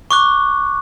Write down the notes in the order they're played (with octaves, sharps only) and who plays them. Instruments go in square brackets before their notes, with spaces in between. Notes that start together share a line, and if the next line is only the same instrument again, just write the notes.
[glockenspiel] C#6 D6 F#6